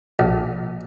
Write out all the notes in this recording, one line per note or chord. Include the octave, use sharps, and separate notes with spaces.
A#1